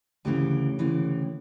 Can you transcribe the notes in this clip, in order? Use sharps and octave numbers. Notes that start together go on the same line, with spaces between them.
D2 C#3 E3 G4
D2 C#3 E3